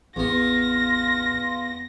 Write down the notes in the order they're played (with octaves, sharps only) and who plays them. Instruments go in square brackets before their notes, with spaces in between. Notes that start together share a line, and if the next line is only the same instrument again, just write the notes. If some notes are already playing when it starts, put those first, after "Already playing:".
[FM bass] A1 [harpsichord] E2 B3 [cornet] F4 [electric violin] A#6